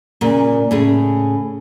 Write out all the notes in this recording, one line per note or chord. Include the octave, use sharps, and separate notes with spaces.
A#2 C#3
A2 C#3 G#4